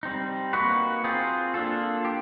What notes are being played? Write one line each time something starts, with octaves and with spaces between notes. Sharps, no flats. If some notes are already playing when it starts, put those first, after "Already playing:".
G3 C4 D#4
A#3 D#4 F#4 B4
C4 F4 G#4 C5
A#3 D4 F4 A4
G4